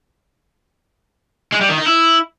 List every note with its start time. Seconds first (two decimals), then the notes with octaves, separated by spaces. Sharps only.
1.52 G#3
1.61 G3
1.69 D#3
1.78 D#4
1.86 E4